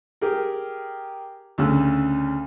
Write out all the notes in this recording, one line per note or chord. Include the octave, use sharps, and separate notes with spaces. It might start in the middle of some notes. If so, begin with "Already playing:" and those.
G4 G#4 A#4
D2 C#3 E6